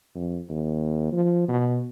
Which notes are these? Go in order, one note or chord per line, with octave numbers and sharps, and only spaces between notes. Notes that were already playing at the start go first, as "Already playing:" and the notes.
F2
D#2
F3
B2